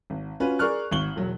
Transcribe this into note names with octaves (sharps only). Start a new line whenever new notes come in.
G#1
C#4 F4 F#4 B4
G#4 A#4 D5 C#6 F6 F#6
G#1 C#6 F#7 G7
E1 F#3